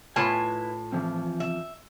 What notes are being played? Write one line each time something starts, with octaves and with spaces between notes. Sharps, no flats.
A2 E4 F4 B4 G#5 A5
E3 F3 C4
E5